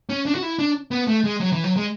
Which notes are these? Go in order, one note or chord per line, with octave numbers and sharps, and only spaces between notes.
C#4
D4
F#4
E4
D4
B3
A3
G#3
F#3
E3
F#3
G#3